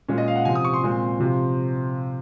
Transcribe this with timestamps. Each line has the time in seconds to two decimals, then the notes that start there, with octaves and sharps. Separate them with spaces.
0.08 A#2 G#3 C#4
0.18 D#5
0.28 F5
0.36 F#5
0.45 C3 F3 C4 G#5
0.55 D#6
0.65 C#6
0.74 C6
0.83 A#2 G#3 C4
1.19 C3 F3 C4